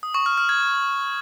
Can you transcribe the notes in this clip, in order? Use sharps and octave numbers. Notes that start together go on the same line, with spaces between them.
D#6
C#6
F6
F6
G#6